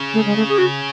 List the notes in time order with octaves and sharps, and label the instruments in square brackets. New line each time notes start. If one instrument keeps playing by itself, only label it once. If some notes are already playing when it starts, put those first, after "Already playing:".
Already playing: [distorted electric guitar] C#3
[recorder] A3
G#3
A3
G#4
F#4